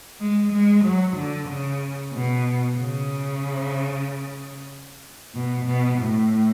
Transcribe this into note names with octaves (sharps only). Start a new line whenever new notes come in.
G#3
G#3
F#3
D3
C#3
B2
C#3
B2
B2
A2